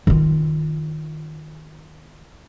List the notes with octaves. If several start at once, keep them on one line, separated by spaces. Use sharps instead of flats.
D#3 F4